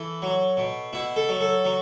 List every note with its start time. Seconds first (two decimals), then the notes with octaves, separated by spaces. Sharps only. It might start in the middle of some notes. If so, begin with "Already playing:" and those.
Already playing: E3 A4
0.22 F#3
0.57 B2
0.93 B2 E4
1.16 A4
1.29 F#3
1.41 A4
1.64 F#3